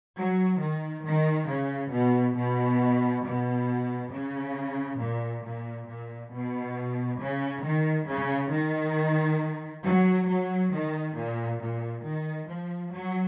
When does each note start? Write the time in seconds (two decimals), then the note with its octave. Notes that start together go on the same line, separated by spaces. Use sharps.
0.18 F#3
0.61 D#3
1.06 D#3
1.49 C#3
1.93 B2
2.37 B2
3.25 B2
4.13 C#3
5.00 A#2
5.45 A#2
5.89 A#2
6.33 B2
7.20 C#3
7.65 D#3
8.08 C#3
8.52 D#3
9.84 F#3
10.28 F#3
10.72 D#3
11.16 A#2
11.60 A#2
12.04 D#3
12.48 F3
12.92 F#3